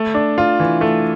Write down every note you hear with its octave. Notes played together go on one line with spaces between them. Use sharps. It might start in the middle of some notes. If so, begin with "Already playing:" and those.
Already playing: A3
D4
F4
E3
A3